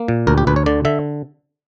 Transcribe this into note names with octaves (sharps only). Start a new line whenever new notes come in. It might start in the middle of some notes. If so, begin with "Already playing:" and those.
Already playing: A#3
A#2
D2 A#4
G4
D2 B4
C#5
D3 D5
D3 E5